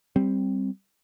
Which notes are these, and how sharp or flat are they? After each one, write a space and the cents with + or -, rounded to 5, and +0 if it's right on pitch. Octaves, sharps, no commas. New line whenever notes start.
G3 +0 C4 +5